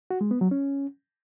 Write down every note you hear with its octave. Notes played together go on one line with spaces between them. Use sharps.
F#4
G#3
B3
F#3
C#4